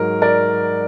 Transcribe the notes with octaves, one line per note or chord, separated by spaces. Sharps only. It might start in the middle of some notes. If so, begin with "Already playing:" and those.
Already playing: G#2 F#3 A#4
A#4 D5